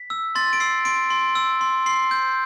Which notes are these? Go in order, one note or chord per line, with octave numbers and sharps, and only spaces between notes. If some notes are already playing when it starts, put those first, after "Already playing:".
Already playing: B6
E6
C6 A6
D7
E6 C7
C6 D7
C6
E6
C6
C6 C7
G6